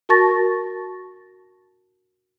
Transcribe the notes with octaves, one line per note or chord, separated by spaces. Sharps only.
F#4 A#4 A5 C#6 A6 A#6